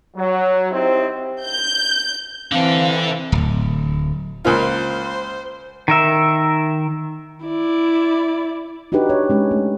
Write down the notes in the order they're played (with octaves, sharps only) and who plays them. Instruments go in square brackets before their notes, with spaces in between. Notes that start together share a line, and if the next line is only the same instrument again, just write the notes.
[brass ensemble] F#3
C4 D#4 E4 G4 C5
[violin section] G6
[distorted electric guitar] D3 A4 [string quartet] E3 [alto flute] C4 [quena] F5
[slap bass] D1
[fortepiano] C#2 A#3 F4 [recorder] C5
[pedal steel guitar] D#3 A#4 E5
[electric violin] E4 D5
[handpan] D4 D#4 F#4 G4 B4
C#5
G#3 C#4
A3